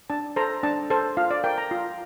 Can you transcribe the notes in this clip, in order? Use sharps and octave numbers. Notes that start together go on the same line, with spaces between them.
D4 A5
A4 C5 A#5
D4 A5
A4 C5 A5
F4 F5
D5
A#4 G5
A#5
F4